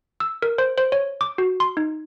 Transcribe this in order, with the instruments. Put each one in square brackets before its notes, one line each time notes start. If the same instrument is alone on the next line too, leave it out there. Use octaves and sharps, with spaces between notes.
[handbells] E6
A#4
C5
C5
C#5
D6
F#4
C6
D#4